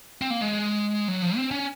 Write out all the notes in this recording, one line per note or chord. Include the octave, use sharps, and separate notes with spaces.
C4
A#3
G#3
F#3
F3
C4
C#4